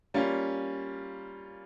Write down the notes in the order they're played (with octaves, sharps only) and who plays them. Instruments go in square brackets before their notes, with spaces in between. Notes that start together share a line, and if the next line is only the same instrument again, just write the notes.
[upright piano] G3 A#3 C#4 F4